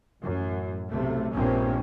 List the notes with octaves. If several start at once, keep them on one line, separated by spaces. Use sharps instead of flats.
A1 F#2
B1 C3 A3
A#1 G2 A#2 A#3 C4 C#4